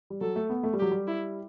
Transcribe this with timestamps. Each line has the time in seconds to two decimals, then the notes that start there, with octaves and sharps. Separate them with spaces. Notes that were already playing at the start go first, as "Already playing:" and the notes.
0.10 G3
0.21 F#3 A4
0.36 A3
0.50 B3
0.63 A3
0.73 G3
0.79 F#3 G4
0.91 G3
1.07 E4